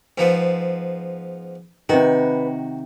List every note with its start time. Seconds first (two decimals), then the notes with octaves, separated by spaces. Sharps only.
0.18 G#2 F3 B3
1.89 C3 D#3 F#4 B4